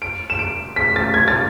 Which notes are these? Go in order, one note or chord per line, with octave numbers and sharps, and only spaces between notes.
D7
E7
D7
B6
A6
G#6
A6